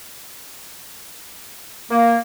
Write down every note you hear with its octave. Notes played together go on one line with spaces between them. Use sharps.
A#3